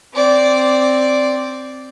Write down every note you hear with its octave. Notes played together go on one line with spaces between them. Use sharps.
C4 D5